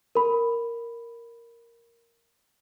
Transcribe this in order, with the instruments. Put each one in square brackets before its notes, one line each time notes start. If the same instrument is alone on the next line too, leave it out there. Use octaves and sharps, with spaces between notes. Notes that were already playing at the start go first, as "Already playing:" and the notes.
[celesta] A#4 B5